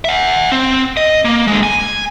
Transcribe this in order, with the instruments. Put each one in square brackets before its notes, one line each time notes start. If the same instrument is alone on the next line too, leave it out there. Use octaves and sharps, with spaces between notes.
[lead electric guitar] E5 F#5
C4
D#5
A#3
D3 G#3
G#5